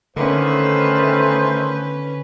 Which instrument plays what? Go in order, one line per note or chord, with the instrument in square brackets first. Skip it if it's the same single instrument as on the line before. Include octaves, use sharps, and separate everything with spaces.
[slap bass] D3 [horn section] D#3 A3 [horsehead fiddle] C#4 B4 [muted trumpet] C5